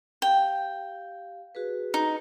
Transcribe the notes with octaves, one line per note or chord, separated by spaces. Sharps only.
G4 F5 G5
F#4 G#4 B4
D#4